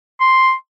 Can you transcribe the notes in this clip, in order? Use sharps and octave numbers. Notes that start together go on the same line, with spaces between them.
C6